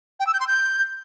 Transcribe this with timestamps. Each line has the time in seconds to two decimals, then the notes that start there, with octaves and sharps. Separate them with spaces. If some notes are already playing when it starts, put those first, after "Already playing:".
0.20 G5
0.27 E6
0.34 G6
0.40 C6
0.47 G6